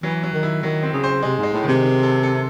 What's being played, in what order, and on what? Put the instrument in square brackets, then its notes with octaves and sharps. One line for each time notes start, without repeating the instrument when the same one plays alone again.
[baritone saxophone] E3 [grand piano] F#3
[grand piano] F#3
[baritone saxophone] D#3
[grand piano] E4
[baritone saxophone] D#3 [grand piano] F#3
[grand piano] C4
[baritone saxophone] C#3
[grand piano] C5
[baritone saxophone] C3 [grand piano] G#3
[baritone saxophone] G#2 [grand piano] G#3
[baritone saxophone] A2
[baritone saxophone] C3 [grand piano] D#3
[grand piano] D#3
A4
A4